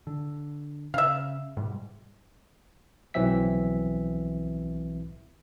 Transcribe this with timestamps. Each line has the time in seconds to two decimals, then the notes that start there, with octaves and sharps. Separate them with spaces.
0.07 D3
0.94 C#3 E5 F5
1.57 G#2 B2 G3
3.14 B1 E3 F#3 C4 E5 B6